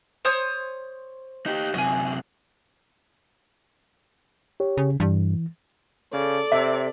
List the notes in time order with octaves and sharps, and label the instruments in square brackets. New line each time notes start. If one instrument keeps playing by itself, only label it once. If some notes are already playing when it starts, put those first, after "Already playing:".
[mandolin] C5 C#5 D#6
[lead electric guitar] D#4 G4
[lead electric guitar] F#2 C3 [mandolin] D#5 G#5
[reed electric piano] G4 C#5
[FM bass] C#3
[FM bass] G2 [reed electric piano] E3
[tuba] C#3 [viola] A4 D5
[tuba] C3 [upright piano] E5